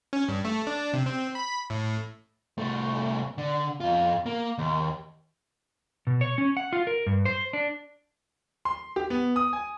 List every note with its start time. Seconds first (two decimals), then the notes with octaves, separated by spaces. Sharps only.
0.13 C#4
0.29 G2
0.45 A3
0.67 D4
0.93 C3
1.06 C4
1.35 B5
1.70 A2
2.58 C2 A3
3.38 D3
3.80 F2 F4
4.26 A#3
4.58 D#2
6.07 B2
6.21 C#5
6.38 C#4
6.57 F#5
6.73 F4
6.87 A#4
7.06 G2
7.25 C5
7.53 D4
8.65 C6
8.96 G4
9.10 B3
9.36 D#6
9.53 G#5